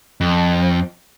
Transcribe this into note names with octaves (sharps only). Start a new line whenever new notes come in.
F2